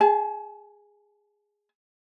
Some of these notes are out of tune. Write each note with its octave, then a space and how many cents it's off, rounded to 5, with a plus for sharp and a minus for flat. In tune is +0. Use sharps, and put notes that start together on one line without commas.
G#4 -5 A5 -40